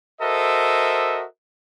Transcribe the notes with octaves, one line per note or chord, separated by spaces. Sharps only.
F#4 A4 A#4 C5 D#5 E5